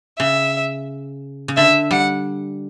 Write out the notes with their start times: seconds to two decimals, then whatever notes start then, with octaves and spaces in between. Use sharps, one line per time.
0.18 C#3 E5
1.48 C#3
1.57 D3 E5
1.91 G3 F#5